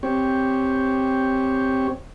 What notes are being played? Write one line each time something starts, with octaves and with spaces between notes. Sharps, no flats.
C4 G4 C#5